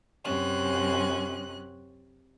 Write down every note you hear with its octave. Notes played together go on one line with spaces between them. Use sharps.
F#2 C3 C#4 F#6